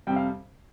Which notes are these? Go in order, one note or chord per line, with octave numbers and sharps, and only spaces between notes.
F2 C3 G3 G5
F5